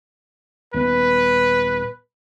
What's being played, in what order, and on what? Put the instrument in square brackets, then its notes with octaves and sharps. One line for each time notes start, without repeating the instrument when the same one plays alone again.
[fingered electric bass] D#1 B3 [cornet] B4